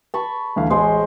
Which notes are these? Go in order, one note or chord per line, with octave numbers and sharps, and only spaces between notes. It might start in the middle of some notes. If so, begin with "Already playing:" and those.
A5 B5 C#6
D2 E3 F5
A1 G#3 C5